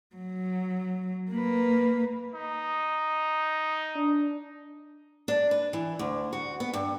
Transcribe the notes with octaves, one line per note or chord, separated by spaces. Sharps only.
F#3
A#3 B4
D#4
D4
D4
B4
E3
D2
F#4
B3
G2